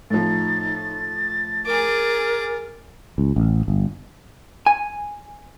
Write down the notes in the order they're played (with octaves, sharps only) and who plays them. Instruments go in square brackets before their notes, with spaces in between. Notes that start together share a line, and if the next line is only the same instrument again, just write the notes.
[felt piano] A2 F3 [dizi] D#4 [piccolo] A6
[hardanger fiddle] G#4 D6 [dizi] A#4
[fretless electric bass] C#2
A1
G1
[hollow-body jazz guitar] G#5